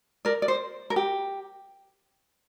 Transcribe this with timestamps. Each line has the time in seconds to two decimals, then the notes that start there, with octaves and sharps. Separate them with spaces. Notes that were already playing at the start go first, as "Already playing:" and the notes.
0.25 A#4 D5
0.42 D5
0.48 C5
0.90 A#4
0.96 G4